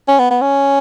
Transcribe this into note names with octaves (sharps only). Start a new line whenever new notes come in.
C#4
B3
B3
C#4